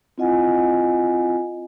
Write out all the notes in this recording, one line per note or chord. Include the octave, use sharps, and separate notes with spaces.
C4 E4 F4 D#5 F#5 G#5